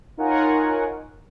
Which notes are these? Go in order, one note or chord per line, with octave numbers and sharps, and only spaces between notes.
D#4 F4 A#4 C#5 F#5 G#5